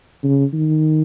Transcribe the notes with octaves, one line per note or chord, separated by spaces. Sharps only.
C#3
D#3